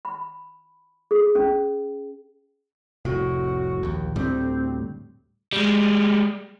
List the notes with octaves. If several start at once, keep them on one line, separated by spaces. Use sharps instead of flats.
B5
G#4
C#4
F1 C2 A2 F#4
A#1 D#2
D2 A2 G3 C4
G3 G#3